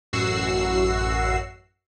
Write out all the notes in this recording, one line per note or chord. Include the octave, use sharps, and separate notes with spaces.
A1 F#2 F#4 E6 C7